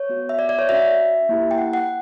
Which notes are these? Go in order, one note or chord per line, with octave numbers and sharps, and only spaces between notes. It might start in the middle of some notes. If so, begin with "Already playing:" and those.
Already playing: C#5
B3 F#4
E5
D5
D5
C#5
C#4 F#4 E5
A#3 E4 G4
G5
F#5
F#5